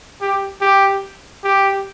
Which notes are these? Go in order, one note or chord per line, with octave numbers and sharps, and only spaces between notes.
G4
G4
G4